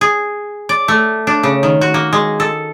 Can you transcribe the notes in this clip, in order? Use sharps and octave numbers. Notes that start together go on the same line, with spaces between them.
G#4
D5
A3
D4
C#3
D#3
F#4
A#3
G#3
A4